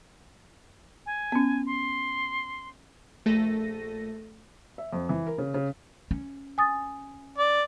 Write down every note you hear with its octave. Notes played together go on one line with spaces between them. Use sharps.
G#5
B3 C#4
C6
A#1 A3 A4 A#6 D#7
E5
F2
E3
A#4
C#3
C#3
C#4
G#5 D#6 A6
D5